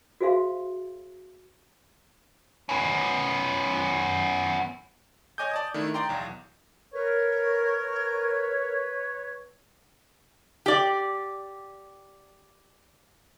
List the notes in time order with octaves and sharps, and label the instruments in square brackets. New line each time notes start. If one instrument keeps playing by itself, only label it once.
[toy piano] F#4 G#4 C5 E5 F5 C6
[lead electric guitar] B3 C#4
[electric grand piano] C#5 D#5 G#5 D6 D#6 G6
D5 A5 D#6
D#3 A3 D4 E4
D5 G5 A#5 C6
B1 E2
[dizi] A#4 [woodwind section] B4 C#5
[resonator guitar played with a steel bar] G4 D5